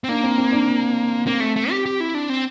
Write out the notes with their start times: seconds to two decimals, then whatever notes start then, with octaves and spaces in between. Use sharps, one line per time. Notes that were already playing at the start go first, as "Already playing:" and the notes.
0.04 C4
0.08 A#3 D4
0.23 C4
0.38 C4
0.52 D4
1.26 A#3 C4
1.40 A3
1.56 A3
1.70 G4
1.86 G4
2.00 E4
2.15 D4
2.29 C4